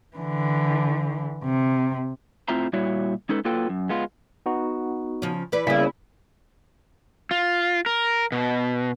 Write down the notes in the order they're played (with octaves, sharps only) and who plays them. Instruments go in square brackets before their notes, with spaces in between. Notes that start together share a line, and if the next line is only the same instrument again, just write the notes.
[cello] D3 E3
C3
[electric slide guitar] A2 C4 F4 C5 E5 A#5
A#2 G3 E4 F#4 C#5 E5
G#3 C#4 D#4 A4 B4
F#3 A#3 F4 A4 B4 G5
F#2
G#3 B3 F4
[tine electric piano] B3 D#4 F#4
[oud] C#3 F3 C#4
E3 B4 D5
[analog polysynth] C#3 E4 [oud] G3 B3 [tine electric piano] A#3 C#4 G#4
[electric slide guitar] F4
A#4
B2